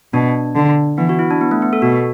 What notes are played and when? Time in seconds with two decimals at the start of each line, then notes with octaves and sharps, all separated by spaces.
0.14 B2 D4
0.56 D3
0.98 E3 B3
1.09 F#4
1.19 E4
1.31 D4
1.41 B3
1.51 A3
1.62 B3
1.73 A4
1.82 B2 F#4